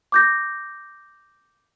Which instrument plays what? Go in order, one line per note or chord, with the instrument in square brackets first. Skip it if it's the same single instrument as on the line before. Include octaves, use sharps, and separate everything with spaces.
[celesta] D6 G6 A#6